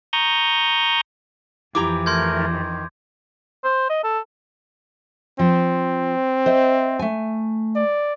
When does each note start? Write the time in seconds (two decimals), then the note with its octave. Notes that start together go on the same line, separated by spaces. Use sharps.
0.13 A#5 C#6 D#6 G6
1.75 F2 E3 E4 G4 A#5 D6
2.06 A3 A#4 C6 G6 G#6
2.50 D#3
3.64 C5
3.90 D#5
4.04 A4
5.39 F3 C4
6.46 C5 D#5 E5
6.99 A3 G#5
7.75 D5